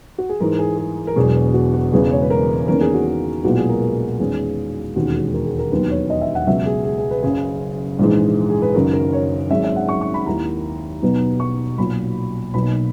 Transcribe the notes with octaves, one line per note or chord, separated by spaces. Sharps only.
F#4
G#4
G#2 E3 G#3 A#4
G#4
G#4
A#4
E1 E2 B2 F#3 G#4
F#4
F#4
E1 E2 C#3 E3 G#3 G#4
C#5
B4
A#4
E2 D#3 A#3 C#4 A#4
G#4
F#4
G#4
B1 A#2 G#3 B3 E4 F#4
G#4
A#4
A#4
E2 D#3 G#3 C#4 E4 G#4
E1 D#2 D#3 G#3 C#4 F#4
G#4
A#4
G#4
A#4
E1 D#2 D#3 F#3 B3 B4
C#5
D#5
E5
F#5
C#2 B2 F#3 E5
G#4
G#4
G#4
B4
F#1 F#2 C#3 G#4
A#1 G#2 E3 G#3
G#4
B4
F#1 F#2 D#3 F#3 A#4
A#4
C#5
G#1 F#2 D#3 G#3 C#4 E5
E5
F#5
C#6
C#6
B5
D#2 D#3 A#3 E4 A#5
B1 B2 F#3 B3 D#4
C#6
B1 A#2 F#3 B5
B1 B2 A#3 D#4 B5